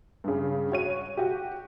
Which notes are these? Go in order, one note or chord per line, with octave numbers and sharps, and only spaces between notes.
G2 C#3
F#4 C#5 D#7
F#4 G4